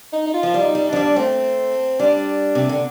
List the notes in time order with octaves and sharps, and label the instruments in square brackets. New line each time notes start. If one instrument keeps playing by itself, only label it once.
[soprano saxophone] D#4
D#4
F4
[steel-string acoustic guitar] F3
G3
[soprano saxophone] D#4
[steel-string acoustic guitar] G3
[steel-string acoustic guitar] F3 [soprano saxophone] D4
[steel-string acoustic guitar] G3
[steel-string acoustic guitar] A3 [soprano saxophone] C4
[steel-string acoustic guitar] G3 [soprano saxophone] D4
[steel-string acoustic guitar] C3
D3